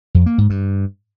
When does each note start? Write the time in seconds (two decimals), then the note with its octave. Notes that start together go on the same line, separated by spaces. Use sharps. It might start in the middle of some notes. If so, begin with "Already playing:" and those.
0.15 F2
0.26 A#3
0.38 G#2
0.50 G2